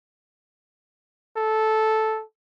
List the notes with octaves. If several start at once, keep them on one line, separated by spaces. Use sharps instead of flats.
A4